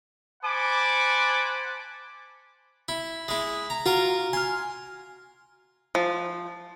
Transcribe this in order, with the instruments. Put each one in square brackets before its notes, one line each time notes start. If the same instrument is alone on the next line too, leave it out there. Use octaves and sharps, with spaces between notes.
[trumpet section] C5 F#5 G#5 A5 B5 D6
[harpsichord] E4
G#3 E4
A#5
[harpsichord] F4 A#4 A#5 [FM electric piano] F#4
[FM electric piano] G#5 F6 [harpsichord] C6
[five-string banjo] F3